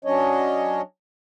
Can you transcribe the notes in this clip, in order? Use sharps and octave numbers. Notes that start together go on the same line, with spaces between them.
F#3 C#4 D4 C#5 D#5